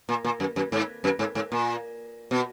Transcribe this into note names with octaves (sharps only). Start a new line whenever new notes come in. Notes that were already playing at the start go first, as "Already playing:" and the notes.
A#2
A#2
F#2
F#2
G#2
F#2
G#2
G#2
A#2
B2